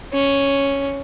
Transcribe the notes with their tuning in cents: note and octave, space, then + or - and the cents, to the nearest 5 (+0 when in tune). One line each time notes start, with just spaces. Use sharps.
C#4 +0